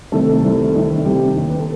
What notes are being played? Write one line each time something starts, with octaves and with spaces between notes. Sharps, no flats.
C2 C3 D#3 A3 A4
C2 C3 D#3
C2 C3 D#3
C2 C3 D#3 G4
D#2 D#3
B4
A4